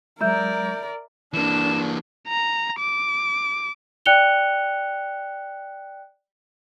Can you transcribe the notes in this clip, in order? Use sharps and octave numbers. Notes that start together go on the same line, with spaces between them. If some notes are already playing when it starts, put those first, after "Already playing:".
F#3 G#3 A#4 D5 E5 A#5 G6
E3 A#3 D4 E7
A#5
D6
D5 G5 F#6 C#7 F7 G7